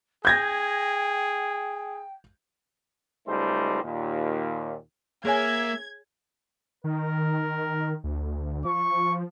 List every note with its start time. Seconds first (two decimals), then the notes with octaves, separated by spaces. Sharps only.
0.25 G#4 G5 G6 G#6 A#6
3.28 C#2 G3 A3 D#4 C5
3.83 D#2 A#2
5.25 A#3 G#4 C#5 E5 G#5 G#6
6.84 D#3 A#4
8.04 D2
8.65 F3 C#6